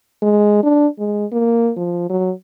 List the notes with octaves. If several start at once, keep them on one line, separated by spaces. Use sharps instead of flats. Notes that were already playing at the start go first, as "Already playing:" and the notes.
G#3
D4
G#3
A#3
F3
F#3